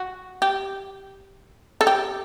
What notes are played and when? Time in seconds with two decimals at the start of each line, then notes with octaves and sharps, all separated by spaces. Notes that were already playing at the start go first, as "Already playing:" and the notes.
Already playing: F#4
0.42 G4
1.81 A4
1.87 G4